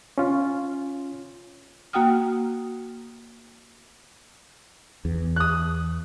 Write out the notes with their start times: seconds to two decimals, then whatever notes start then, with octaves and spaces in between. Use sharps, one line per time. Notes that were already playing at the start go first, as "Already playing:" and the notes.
0.18 C#4 F4
1.93 A#3 F#4 F#5 G5 D#6 F6
5.05 E2
5.36 D#6 F#6